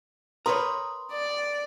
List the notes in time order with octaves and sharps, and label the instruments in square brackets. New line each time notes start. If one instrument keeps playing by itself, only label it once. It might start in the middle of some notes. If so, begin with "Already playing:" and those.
[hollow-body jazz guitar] A#4 B4 C#5 [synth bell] A#5 C6 D#6
[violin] D5